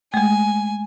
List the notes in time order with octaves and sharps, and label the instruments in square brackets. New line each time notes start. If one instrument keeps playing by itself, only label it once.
[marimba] G#3 A3 [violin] G#5